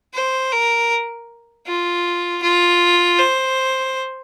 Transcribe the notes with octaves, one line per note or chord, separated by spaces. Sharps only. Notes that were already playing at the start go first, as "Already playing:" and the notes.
C5
A#4
F4
F4
C5